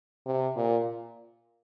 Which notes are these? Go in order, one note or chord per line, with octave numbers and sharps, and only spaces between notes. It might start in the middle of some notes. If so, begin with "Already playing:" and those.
C3
A#2